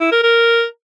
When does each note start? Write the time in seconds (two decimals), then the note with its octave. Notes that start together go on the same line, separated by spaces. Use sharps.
0.01 E4
0.12 A#4
0.23 A#4